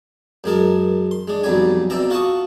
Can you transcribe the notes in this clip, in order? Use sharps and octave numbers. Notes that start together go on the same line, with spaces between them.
F#2 G#3 A#4 A5
C6
G#3 D4
B1 F2 F#3 G3 D5 G#5
B2 C4 D5 E5 A#5
F4 F#4 F#5 A5 C#6 D#6